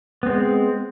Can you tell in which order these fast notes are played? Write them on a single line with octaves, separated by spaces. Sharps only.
B3 C4 G#3